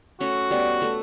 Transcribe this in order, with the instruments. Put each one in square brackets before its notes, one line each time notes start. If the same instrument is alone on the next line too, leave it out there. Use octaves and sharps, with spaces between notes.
[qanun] A3 C#4 [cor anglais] F#4
[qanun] G3 B3
A3